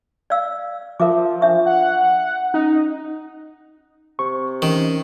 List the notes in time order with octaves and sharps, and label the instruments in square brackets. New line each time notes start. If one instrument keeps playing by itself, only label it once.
[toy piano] D5 F5 E6
[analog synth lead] F3 [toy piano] A#4 E5 D6
[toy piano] D4 E5 C#6
[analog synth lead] F#5
[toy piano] C#4 [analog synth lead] D#4
[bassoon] C3 [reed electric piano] C#6
[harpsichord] D#3 [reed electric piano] E3 C#4